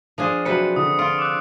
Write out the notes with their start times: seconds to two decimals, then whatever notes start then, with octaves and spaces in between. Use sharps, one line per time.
0.18 F3 D4 G#4
0.45 C3 F#3 B4 C5 C#7
0.76 D3 D#6
0.99 F4 D7
1.19 D6 E6 F#6